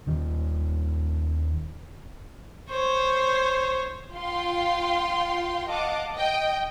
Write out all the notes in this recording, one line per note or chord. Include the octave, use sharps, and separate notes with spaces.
D#1 D#3
C5 C#5
F4 F5 G5 C6
D#5 F5 F#5 A5 D6
D#5 G5